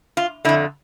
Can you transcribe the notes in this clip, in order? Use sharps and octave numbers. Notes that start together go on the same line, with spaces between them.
F4
F2 D3 E4